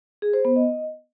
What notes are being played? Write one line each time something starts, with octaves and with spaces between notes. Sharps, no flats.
G#4
C5
B3
D#5